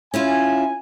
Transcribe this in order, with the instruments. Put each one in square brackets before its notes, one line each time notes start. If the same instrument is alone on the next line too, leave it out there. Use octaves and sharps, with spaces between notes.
[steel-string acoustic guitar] C#4 E4 F4 [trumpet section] G#5